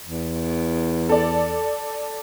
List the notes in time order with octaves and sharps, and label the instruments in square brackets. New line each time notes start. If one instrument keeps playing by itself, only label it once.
[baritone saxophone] E2
[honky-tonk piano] A4 D5